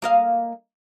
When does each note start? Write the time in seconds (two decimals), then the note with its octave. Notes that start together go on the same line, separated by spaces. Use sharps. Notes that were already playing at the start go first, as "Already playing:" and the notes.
0.02 A#3 D#5 F5